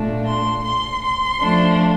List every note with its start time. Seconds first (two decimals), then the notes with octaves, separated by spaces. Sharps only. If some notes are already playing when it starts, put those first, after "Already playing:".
Already playing: A#2 A3 D4
0.26 C6
0.64 C6
1.02 C6
1.39 F3 A3 D4